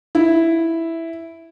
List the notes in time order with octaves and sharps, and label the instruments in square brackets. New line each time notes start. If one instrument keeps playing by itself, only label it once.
[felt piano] E4